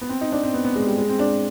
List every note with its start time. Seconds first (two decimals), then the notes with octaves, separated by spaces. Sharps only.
0.01 B3
0.09 C4
0.21 D#4
0.32 D4
0.43 C4
0.54 B3
0.65 B3
0.76 G#3
0.87 G3
0.98 G#3
1.09 C4
1.19 D4